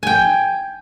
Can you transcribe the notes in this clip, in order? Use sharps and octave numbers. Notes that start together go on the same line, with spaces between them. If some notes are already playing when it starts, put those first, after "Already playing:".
G5 G#5